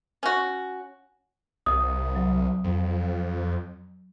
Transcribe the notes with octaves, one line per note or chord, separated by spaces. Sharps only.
C#4 F#4
C2 D#6
C2 F#3
F2